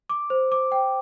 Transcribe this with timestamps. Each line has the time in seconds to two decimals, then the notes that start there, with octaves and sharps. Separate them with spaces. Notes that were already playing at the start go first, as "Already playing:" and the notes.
0.09 D6
0.30 C5
0.52 D6
0.72 G5